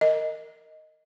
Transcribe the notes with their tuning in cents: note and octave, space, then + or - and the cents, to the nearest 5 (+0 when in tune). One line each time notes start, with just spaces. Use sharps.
A#4 -20 D#5 +5